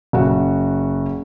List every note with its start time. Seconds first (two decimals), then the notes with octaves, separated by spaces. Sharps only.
0.13 F#1 F#4